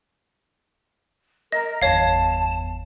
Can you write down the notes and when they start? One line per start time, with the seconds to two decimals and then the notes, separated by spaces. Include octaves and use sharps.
1.52 A#4 D#5
1.82 G1 E2 C#5 F5 A5